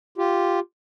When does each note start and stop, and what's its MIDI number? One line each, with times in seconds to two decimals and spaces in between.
0.18 0.60 65
0.18 0.60 67